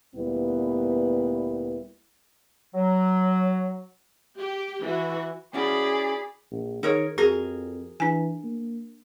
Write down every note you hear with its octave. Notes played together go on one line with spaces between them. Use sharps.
D2 A#2 G3 B3 E4 B4
F#3
G4
E3 F#4
C#4 E4 F#4 G#4 D5 B5
A#1
D#3 D#4 G#4 A#4 C#5
F2 F#4 G#4 A#4
E3 D4 G#5
A#3